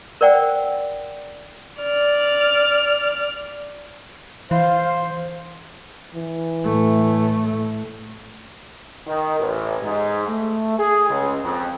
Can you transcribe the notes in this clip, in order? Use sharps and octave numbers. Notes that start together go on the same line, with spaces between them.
A#4 C5 D5 F#5 G5
D5 F6
E3 C5 F5
E3
A2 A3
D#3
A1
G#2
A3
G#4
C#2
F2